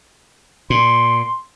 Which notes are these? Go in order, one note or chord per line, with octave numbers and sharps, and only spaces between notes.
A#2 C6